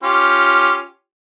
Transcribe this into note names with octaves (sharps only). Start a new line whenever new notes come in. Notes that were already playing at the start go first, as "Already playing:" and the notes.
C#4 F4 G4